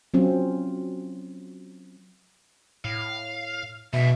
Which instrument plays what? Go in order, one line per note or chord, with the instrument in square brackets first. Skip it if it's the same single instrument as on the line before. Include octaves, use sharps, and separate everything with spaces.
[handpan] F#3 C4 C#4 F4
[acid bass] A2 [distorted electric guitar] F5
[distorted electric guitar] E2 G#2 [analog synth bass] B2 [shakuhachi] E5